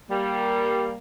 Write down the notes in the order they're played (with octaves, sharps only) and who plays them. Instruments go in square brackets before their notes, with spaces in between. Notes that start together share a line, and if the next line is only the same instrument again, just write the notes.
[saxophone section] G3 A#3